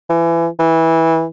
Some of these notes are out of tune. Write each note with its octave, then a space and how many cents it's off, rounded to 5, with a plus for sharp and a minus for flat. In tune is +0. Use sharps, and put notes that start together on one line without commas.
E3 +25
E3 -15